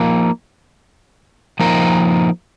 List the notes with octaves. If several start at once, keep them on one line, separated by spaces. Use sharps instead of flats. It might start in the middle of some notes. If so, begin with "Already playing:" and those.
Already playing: F3 A#3 D#4
F3 A#3 D#4 A#4 D#5